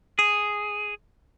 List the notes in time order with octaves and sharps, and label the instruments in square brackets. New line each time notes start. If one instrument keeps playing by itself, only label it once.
[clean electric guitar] G#4